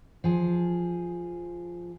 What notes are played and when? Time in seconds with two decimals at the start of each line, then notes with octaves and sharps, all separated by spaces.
0.24 F3 G#4